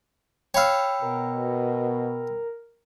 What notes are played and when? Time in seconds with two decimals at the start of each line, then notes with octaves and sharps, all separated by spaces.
0.54 C#5 F5 G5 B5 E6
1.02 B2 A#4